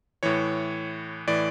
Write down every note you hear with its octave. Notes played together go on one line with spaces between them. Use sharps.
A2 E3 C#5
A2 E3 D5